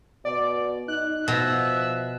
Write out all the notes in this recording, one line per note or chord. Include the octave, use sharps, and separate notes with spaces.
B2 D5
D#4 F#6
B2 F3 E5 E6